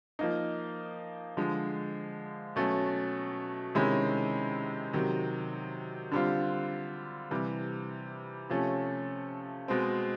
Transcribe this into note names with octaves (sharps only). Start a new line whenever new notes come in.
F3 A#3 D#4
D3 F3 G#3
B2 F#3 A3 C#4
C3 D#3 G#3 C#4 E4
C3 D#3 F#3
D3 G3 C4 F4
C3 E3 G3
C3 F3 A3 C#4
B2 G#3 C4